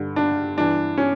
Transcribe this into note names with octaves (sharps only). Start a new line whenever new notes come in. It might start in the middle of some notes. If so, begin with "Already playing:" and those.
Already playing: G2 D3
D4
G2 E3 D4
C#4